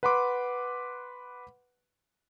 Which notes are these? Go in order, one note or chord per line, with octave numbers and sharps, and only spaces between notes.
B4 F#5 B5 C6 D6